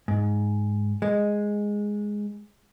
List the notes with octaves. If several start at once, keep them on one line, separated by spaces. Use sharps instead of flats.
G#2
G#3